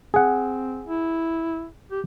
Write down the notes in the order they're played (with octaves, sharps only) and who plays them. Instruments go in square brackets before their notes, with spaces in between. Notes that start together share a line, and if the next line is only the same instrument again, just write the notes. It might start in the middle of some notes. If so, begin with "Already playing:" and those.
[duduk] C4 [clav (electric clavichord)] G#4 F#5
[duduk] E4
G4